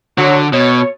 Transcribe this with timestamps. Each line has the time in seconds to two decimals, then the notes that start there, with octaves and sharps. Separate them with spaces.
0.18 D3 F#3 F#4
0.53 B2 C#5